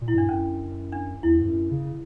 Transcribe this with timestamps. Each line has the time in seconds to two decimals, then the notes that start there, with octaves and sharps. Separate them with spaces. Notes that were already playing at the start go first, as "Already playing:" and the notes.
0.01 A#2
0.08 E4
0.14 G2 D4
0.29 F#2 C#4
0.92 D4
1.23 E2 E4
1.40 G2
1.47 F#2
1.71 C#3